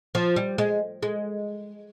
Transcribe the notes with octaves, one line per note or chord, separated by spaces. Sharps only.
F3
G3
G#3
G#3